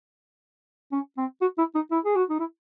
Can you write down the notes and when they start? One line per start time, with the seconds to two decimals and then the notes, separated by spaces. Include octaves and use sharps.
0.92 C#4
1.18 C4
1.41 F#4
1.58 E4
1.75 D#4
1.91 E4
2.05 G#4
2.15 F#4
2.30 D#4
2.39 E4